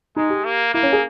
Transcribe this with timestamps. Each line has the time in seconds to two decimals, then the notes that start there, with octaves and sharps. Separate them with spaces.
0.16 G#3 D#4
0.30 G4
0.45 A#3
0.74 A#3 E4
0.83 C#4
0.93 G#4